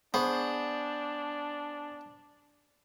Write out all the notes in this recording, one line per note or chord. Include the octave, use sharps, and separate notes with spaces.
B3 D4 G#4 C5 C#6